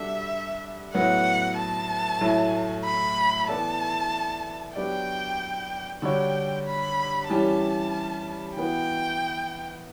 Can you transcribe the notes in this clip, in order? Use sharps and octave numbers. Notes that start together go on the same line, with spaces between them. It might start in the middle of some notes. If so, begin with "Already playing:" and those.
Already playing: G3 D4 F#4 A4 E5
A2 F#3 B3 F#5
A5
A2 F#3 A3 E4
B5
E3 B3 E4 A4 D5 A5
F#3 B3 D4 G4 D5 G5
D3 G3 D4 F#4 C#5 G5
B5
E3 G3 C#4 G4 A5
E3 B3 F#4 G5